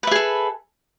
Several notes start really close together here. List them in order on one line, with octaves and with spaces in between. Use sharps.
B4 E5 G#4 A4